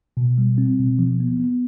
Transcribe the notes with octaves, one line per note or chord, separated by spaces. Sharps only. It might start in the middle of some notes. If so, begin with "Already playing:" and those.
B2
G3
C4
B2
F3
B3
B3